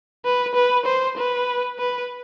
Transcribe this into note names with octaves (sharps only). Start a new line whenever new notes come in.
B4
B4
C5
B4
B4